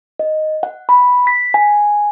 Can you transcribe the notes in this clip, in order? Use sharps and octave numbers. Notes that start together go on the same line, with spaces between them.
D#5
F#5
B5
B6
G#5